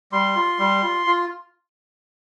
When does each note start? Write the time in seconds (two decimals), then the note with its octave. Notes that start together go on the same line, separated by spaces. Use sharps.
0.12 G3 C6
0.36 F4
0.59 G3
0.83 F4
1.06 F4